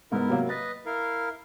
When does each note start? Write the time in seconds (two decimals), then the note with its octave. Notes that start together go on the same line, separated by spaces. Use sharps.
0.12 G#2 B3 E4 A#4
0.29 C3 F#3 A#3
0.49 B4 D#5 A6
0.86 E4 A#4 F5